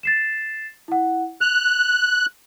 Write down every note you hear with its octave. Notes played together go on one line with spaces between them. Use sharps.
A6 C7 E7
E4 F#5
F#6 F7